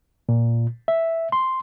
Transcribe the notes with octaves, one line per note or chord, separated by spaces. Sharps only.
A#2
E5
C6